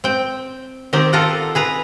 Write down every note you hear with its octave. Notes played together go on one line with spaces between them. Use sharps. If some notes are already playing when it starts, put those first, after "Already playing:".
C4 G5
D#3 C4 D#4 G4
F4 A4 A#4 D#5 F#5
G#4 B4 A#5